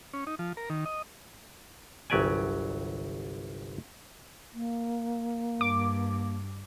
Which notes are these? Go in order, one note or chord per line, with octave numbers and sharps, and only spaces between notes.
C#4
D#4
F3
A#4
D#3
D#5
G1 C2 F#3 G4 D5 G#5
A#3
G2 D6